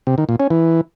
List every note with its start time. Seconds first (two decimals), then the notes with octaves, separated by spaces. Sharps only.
0.07 C3
0.18 D#3
0.29 A#2
0.40 C#4
0.50 E3